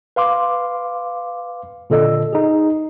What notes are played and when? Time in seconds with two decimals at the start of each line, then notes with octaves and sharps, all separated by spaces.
0.16 B4 F5 C6 D6
1.90 A#2 D3 A4 D#5 E6
2.33 D#4 G#4